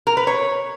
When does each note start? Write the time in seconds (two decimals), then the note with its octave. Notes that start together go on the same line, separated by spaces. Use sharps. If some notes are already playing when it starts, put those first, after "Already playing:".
0.07 A#4
0.17 B4
0.27 C#5